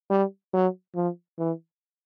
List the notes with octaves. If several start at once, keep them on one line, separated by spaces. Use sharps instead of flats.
G3
F#3
F3
E3